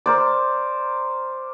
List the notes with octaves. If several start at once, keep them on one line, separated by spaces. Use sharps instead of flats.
A#4 C5 D5